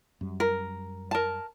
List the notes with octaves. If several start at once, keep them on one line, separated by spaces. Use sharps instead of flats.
F#2 G3
A#4
A#4 A5